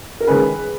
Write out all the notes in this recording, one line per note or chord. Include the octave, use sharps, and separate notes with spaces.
A#4
D#3 G#3 C#4 G#4 B4